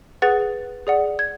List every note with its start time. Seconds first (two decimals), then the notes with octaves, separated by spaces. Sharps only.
0.22 G#4 B4 F#5 A6
0.87 G#4 D5 F#5
1.19 G#6